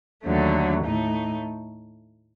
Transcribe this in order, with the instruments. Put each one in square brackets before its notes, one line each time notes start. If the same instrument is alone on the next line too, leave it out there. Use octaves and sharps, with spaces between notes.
[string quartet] D#2 D3 F#3 A3
A2 A3 D#4